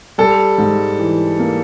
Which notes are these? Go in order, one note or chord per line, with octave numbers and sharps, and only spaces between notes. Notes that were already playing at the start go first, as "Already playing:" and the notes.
G3 A4
G#2
E3
A#3